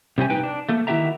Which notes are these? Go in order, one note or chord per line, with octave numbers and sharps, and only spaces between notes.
C3 G3 C4 C#4 G4 G#5
D#4 B4 G5
D4
A3 A#3 A4
D#3 E4 F#4 G4 E5 A#5